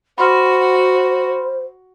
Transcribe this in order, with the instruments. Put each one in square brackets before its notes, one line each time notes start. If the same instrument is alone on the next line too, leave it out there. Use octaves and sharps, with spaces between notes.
[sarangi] F#4 [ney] C5 [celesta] B5 C6 F6